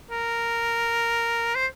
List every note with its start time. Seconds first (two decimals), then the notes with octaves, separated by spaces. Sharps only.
0.11 A#4
1.55 C5